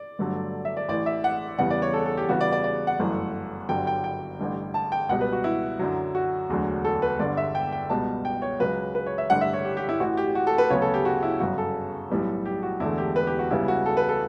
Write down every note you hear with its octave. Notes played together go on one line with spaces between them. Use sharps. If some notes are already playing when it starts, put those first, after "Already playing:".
Already playing: D5
G1 G2 D3 F#3 A3
E5
D5
A1 A2 E3 D5
E5
F#5
E2 C#3 G3 B3 F#5
D5
C#5
A4
A4
G4
E2 C#3 G3 B3 F#4
D5
D5
D5
F#5
G1 F#2 E3 A3
G1 G2 D3 F#3 G5
G5
G5
A1 G2 D3
A5
G5
C#2 B2 G3 F#5
B4
F#4
E4
F#2 D3 F#3
F#4
E1 D2 D3 F#3
A4
B4
G1 G2 D3 D5
E5
G5
G5
C#2 B2 G3 B3 A5
G5
C#5
C#2 C#3 F#3 B4
B4
C#5
E5
A1 G2 D3 F#5
E5
C#5
G4
G4
E4
A1 A2 E3 F#4
G4
F#4
A4
B4
D2 C#3 F#3 B3 C#5
A4
G4
F#4
E4
G1 F#2 C#3 F#4
A4
B1 A2 G3 B3
G4
F#4
E1 E2 D3 A3 E4
G4
B4
G4
F#4
C#2 C#3 G3 B3 E4
F#4
A4
B4
A4